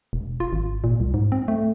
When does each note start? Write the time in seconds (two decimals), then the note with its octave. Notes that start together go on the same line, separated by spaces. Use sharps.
0.13 E1
0.40 F4
0.53 G#1
0.84 A#2
1.00 C2
1.14 G#2
1.32 C4
1.48 A3